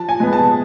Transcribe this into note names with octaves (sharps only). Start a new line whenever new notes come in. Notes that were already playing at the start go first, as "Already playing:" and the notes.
Already playing: F3 A5
G#5
G#3 B3
A5